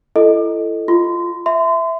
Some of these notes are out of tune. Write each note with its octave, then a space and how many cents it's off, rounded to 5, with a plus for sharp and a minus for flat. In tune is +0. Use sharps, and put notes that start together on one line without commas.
E4 +35 A4 +0 D#5 +0
F4 -10 C6 -25
E5 +0 C6 -35